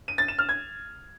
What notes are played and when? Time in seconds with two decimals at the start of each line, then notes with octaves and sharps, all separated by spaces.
0.08 D#7
0.18 A6
0.28 E7
0.39 F6
0.49 G#6